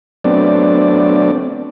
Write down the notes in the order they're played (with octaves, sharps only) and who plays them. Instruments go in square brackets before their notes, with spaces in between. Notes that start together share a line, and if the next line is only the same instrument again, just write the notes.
[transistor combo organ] F#3 A3 B3 C4 D4 D5